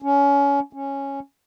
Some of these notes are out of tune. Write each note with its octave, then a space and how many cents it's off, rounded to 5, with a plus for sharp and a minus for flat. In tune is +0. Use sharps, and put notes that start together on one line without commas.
C#4 +25
C#4 -5